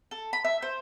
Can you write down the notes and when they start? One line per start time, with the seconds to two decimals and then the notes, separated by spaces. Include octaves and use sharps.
0.11 A4
0.33 B5
0.45 E5
0.62 C5